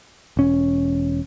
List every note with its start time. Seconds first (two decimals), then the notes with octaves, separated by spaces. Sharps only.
0.37 E1 C#4